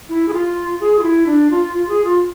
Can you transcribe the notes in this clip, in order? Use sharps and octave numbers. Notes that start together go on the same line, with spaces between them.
E4
G#4
F4
G#4
F4
E4
D4
F4
F4
G#4
F4